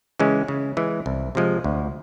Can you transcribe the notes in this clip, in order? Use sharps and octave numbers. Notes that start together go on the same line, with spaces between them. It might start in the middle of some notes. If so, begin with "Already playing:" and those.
C#3 E3 G#3 C#4
C#3
E3 G#3
C2
C3 F3 G#3
D2